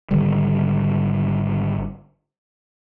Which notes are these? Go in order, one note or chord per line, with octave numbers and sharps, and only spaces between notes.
G#1 D3 D#3 G3